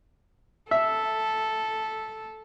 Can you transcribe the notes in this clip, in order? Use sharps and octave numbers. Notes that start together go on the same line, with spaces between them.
A4 E5